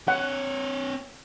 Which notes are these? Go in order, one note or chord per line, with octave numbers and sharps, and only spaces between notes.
C4 C#5 F#5